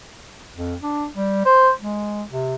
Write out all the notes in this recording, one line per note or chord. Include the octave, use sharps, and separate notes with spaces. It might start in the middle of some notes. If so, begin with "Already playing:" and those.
F2
D4
G3
C5
G#3
C3